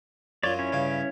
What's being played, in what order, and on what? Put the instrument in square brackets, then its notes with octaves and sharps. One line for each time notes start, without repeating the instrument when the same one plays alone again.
[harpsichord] F#2 F4 [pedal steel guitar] C#5 D5
[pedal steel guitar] C#4 E4 C#5
[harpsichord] G2 C#3 F5